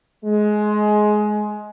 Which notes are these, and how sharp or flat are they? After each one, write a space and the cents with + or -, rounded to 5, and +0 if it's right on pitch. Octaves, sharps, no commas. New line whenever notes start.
G#3 +20